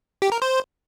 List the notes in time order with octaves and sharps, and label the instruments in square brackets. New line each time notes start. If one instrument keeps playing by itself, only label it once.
[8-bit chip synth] G4
A#4
C5